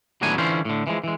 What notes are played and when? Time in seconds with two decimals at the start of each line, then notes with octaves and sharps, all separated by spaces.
0.22 D#2 A2 F#3 B3 D4 G#5
0.38 D3 E3 C#4 F4 C5
0.65 A2 D3
0.87 E3 F3 G#3
1.04 E3 G#3